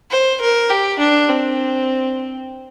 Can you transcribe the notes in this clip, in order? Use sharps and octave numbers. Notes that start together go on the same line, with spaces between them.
C5
A#4
G4
D4
C4